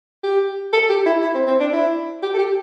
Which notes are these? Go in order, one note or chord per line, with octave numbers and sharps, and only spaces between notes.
G4
A4
G4
E4
E4
C4
C4
D4
E4
G4
A4
G4